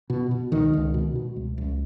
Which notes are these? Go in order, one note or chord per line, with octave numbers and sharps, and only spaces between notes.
B2
B2
C#2 D#3
C#2
B2
B2
C#2
C#2